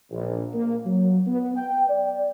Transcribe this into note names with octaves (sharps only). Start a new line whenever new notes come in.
A#1
A#3
F#3
B3
G5
D5